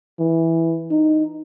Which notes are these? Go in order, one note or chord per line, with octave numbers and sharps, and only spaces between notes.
E3
D#4